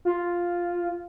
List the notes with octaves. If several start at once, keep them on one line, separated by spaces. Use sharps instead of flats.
F4